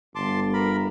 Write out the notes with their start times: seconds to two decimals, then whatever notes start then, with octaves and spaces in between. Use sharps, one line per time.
0.15 G1 A5 C6 D6
0.54 A#4 B5